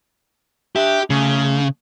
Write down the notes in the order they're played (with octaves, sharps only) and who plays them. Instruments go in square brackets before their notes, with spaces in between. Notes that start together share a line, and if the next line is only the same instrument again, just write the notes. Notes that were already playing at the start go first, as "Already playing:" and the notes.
[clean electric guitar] D4 E5 [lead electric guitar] G4
[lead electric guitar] C#3 [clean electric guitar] A3 C#4 G#4